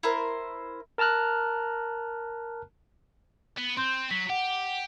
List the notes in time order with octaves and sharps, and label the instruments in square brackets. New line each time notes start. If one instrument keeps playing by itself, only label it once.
[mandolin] E4 A#4 C5
[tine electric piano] A#4 A5 A#5 F6 F#6
[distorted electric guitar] B3
[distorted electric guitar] C4 [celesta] C6 G6
[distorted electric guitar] F#3 [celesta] B6
[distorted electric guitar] G4 [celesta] F#5